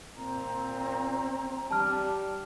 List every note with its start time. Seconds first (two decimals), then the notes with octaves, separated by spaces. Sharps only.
0.17 A#2 C4 A#5
1.71 G3 D4 A5 F6